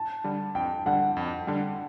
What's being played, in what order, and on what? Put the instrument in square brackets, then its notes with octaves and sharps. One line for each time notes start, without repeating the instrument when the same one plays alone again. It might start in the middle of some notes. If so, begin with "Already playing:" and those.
Already playing: [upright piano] A5
[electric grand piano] D3 G3
[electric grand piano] F2 [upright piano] G5
[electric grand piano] D3 G3 [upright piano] F#5
[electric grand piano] F2
D3 G3